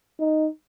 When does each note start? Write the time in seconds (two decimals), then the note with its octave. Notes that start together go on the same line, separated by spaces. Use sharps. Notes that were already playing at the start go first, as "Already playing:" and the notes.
0.20 D#4